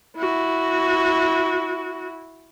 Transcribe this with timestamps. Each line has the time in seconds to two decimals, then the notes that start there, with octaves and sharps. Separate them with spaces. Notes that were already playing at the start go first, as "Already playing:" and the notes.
0.17 E4 F#4